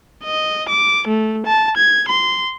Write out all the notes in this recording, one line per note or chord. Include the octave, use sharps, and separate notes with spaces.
D#5
D6
A3
A5
G#6
C6